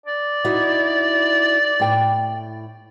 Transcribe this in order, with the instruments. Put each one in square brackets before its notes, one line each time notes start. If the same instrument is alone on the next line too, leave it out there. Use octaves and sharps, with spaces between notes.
[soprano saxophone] D5
[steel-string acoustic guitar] D#4 E4 F#4
A2 G5